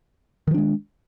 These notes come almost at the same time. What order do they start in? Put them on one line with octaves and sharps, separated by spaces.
D#3 F3 D4 G#3